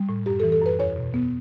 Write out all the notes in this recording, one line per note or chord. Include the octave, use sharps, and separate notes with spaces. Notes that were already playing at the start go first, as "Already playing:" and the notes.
Already playing: G3
A2
F#2 G4
A4
E3
A4
F#2 B4
E2 C#5
B2
B3